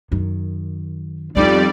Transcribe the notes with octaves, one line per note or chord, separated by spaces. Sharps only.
F#2 D#3
F2 G3 B3 D#4 D5